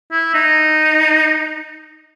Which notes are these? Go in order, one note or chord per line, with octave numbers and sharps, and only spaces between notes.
E4
D#4